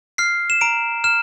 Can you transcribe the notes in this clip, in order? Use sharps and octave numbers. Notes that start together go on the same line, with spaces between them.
F6 C7
E7
A#5 D7
F6 E7